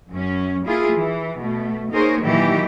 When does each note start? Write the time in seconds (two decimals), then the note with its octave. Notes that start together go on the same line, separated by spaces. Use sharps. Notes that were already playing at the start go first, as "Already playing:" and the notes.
0.11 F#2 C#4
0.67 A#3 E4 F4 G#4
0.97 E3
1.42 B2 A3
1.93 A#3 D#4 G#4 A#4 C5 C#5
2.23 A#2 D#3 E3 F#3 G4